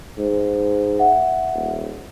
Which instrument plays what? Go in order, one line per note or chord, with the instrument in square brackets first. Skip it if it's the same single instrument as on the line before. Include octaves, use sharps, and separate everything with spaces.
[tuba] G#2
[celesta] E5 F#5
[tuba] D#1